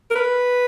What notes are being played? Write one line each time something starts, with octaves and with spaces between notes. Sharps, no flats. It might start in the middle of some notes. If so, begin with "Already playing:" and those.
A#4
B4